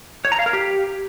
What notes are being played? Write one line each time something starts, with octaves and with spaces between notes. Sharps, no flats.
C#5
A#5
F5
A#4
G4